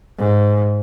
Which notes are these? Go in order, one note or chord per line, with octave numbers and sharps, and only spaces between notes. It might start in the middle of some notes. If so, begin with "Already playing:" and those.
G#2